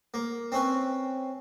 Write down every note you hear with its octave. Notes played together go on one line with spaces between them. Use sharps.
A#3
C4 C#4 B4